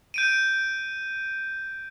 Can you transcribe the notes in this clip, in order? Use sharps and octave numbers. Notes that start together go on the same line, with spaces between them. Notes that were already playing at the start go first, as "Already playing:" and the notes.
G6 D7 D#7